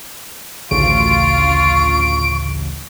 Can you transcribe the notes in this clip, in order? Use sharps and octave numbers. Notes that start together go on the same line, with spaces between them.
A1 D2 C#3 F4 C#6 D7